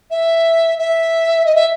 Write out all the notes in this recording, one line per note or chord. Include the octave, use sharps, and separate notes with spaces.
E5
E5
D#5
E5